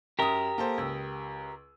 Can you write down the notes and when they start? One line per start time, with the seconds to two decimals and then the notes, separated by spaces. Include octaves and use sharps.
0.19 F#2 G4 A#4 D#6
0.58 A#3 A4 C5
0.78 C#2 E6